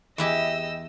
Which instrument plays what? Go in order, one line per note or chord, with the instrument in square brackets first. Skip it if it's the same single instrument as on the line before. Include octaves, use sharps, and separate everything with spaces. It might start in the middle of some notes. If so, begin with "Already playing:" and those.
[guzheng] E2 E4 G4 [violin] D#5 E6